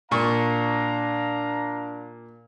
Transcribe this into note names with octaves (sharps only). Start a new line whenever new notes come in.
A#2 D4 F5 A#5 C#6